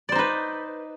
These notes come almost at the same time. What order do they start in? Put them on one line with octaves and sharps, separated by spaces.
D5 C5 D#4 B4